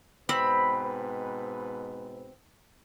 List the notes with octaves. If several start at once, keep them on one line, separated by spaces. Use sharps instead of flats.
G#2 B2 C4 B4 B5